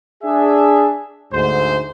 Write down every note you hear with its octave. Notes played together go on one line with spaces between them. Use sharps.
D4 G#4 E5
D2 G#2 C5